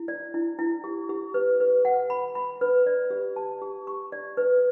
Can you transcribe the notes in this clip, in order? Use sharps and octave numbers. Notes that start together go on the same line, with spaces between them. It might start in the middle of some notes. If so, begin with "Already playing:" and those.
Already playing: E4
D5
E4
E4
G4
G4
B4
B4
F#5
B5
B5
B4
D5
G4
A5
G4
C#6
D5
B4